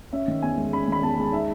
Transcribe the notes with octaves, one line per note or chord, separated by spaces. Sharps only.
C#4 E5
D#3
E2 G#5
G#3
C#4 B5
D#3 B5
E2 A5
G#3
D#4 E5